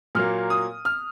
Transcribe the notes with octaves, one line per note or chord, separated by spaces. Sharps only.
A#2 F#3 A#3 F6
D#6
F6